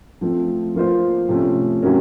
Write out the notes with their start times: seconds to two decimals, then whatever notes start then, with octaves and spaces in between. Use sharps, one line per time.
0.21 F3 A3 C4 F4
0.75 F3 A#3 F4 C5
1.28 C3 F3 A3 C#4
1.82 C3 F#3 A#3 C#4 F#4